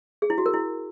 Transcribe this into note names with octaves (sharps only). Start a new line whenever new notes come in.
G#4
E4
F#4
A#4
E4